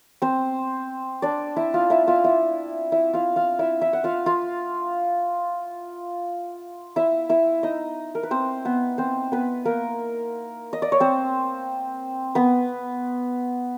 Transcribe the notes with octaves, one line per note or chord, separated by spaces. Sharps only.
C4 C5
D4 D5
E4 E5
F4 F5
E4 E5
F4 F5
E4 E5
E4 E5
F4 F5
F4 F5
E4 E5
E4 E5
F#5
F4 F5
F4 F5
E4 E5
E4 E5
D#4 D#5
A#4
B4
C4 C5
B3 B4
C4 C5
B3 B4
A#3 A#4
D#5
D5
C#5
C4 C5
B3 B4